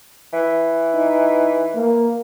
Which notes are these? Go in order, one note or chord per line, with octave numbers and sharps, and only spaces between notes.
E3
D#4
A#3